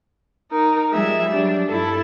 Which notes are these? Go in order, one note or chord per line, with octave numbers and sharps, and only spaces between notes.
D#4 A#4
F3 G3 G#3 E5
F#3 G3 D4
G2 E4 A4